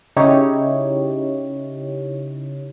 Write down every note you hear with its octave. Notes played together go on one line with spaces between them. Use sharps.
C#3 D#4 E4 G4 C#5